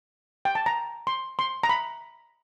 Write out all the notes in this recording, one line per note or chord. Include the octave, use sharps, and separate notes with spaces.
G5
A5
A#5
C6
C6
A#5
B5